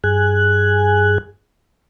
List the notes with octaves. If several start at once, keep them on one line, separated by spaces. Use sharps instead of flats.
G2 G#4 G#5 F#6